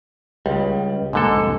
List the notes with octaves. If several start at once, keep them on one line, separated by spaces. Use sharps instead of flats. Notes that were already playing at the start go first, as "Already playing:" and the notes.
C#2 C#3 G3
B1 G#2 D3 A#3 A4
C2 F2